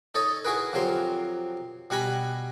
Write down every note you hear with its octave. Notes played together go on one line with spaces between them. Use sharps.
D#4 A4 C#5 D#5
E4 F#4 G#4 A#4 B4
F2 C3 F#3 A#4 C6
B2 G3 F#5 G#5 A#5 B5